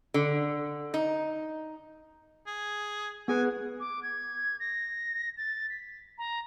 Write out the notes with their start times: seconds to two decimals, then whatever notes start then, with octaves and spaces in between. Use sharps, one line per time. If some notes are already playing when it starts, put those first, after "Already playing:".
0.14 D3
0.94 D#4
2.47 G#4
3.28 B3 G#4 B4 G#5
3.80 D6
4.03 G#6
4.60 A#6
5.37 A6
5.70 B6
6.18 A#5